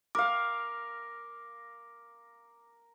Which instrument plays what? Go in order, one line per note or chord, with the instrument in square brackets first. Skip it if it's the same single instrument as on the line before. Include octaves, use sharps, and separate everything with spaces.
[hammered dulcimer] A#4 F5 [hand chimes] D6